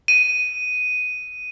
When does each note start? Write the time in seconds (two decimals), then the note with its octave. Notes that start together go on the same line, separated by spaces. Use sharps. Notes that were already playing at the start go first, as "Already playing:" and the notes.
0.08 D#7